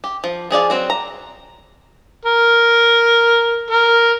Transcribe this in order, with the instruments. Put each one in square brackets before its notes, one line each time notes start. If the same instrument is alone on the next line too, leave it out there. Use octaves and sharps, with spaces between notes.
[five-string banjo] G4
F3
F3 G#4 D5 F5
F#3 C4 F#4
A#5
[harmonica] A#4
A#4